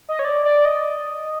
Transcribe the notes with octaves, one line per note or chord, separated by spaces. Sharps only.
D#5
C#5
D5
D5
D#5